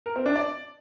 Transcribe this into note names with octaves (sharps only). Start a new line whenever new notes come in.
A#4
C4
D4
D5